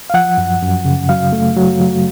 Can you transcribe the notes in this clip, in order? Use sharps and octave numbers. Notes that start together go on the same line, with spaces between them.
F5
F3 F#5
F#2
F#2
C#3
F#3 F5
A3
F#3
F#3